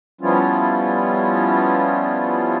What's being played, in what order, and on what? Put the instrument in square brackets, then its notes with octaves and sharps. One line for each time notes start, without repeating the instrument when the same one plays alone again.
[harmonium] F3 G3 B3 C#4 E4 F4